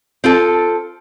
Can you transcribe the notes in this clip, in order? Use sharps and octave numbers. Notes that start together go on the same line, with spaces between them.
C4 F4 A4